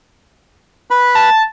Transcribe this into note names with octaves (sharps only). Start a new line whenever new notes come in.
B4 B5
A5